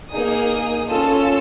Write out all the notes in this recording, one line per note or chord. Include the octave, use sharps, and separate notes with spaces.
A#3 D#4 G#4 D#6
C#4 F4 A4 E6